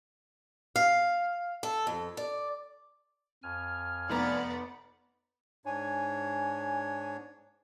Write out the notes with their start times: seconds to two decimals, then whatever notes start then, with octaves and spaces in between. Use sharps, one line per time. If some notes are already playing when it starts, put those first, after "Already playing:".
0.76 F5
1.63 A4
1.87 F2
2.17 D5
3.43 F2 G#5 F6
4.09 F1 B3 D5 A#5
5.66 G#2 D4 C#5 G#5